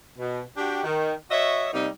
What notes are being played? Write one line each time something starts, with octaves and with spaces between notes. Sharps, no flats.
B2
D4 F#4 G4
D#3
F#4 C#5 D#5 E5
C3 G3 A#3 D#4